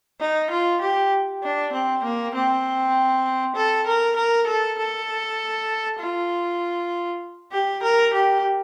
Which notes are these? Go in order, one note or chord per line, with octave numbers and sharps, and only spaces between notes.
D#4
F4
G4
D4
C4
A#3
C4
A4
A#4
A#4
A4
A4
F4
G4
A#4
G4